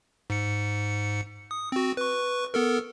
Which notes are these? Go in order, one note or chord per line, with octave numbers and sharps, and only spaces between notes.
G#2 C#7
D#6
C4 F#4
B4 C#6
B3 A4 A#4